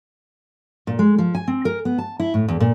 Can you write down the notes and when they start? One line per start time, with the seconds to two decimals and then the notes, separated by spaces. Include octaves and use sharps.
0.87 A#2
0.99 G#3
1.18 F3
1.35 G#5
1.48 C4
1.65 A#4
1.85 B3
1.98 A5
2.20 E4
2.34 A2
2.48 E2
2.60 A#2